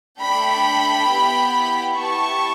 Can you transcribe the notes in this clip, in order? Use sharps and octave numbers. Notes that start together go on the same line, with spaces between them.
A3 D4 A4 G5 B5
B3 E4 G4
B3 E4 G4 A5 C#6